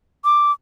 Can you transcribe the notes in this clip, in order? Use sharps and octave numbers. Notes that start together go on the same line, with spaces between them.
D6